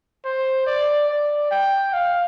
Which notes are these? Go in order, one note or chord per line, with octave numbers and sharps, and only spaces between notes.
C5
D5
D5
G5
F5